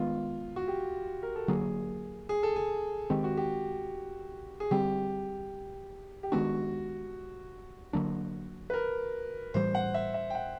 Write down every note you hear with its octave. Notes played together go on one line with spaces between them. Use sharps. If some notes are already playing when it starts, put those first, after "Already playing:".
Already playing: D#3 G#3 B3 F4
F#4
G4
A#4
A4
D3 F#3 A#3 G#4
G#4
A4
G#4
D#3 G#3 C4 G4
F#4
G4
G#4
D3 G3 C4 G4
G4
D#3 G#3 B3 D4 F#4
D3 F#3 A#3 D4
B4
A#4
A2 E3 G3 C5
F#5
E5
E5
G5
F#5